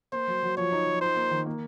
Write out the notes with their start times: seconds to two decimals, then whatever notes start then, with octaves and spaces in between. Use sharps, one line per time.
0.12 A#3 C5
0.27 F#3
0.43 F#3
0.57 F3 C#5
0.72 D#4
0.87 F3
1.01 D#4 C5
1.16 A#3
1.31 D#3
1.46 A#3